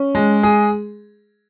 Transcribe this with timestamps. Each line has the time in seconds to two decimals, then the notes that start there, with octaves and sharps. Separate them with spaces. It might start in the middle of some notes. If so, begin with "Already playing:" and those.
Already playing: C#4
0.15 G#3
0.43 G#4